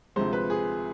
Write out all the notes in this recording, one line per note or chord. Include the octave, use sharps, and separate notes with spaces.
D2 C3 F3 G#3 C5
B4
G#4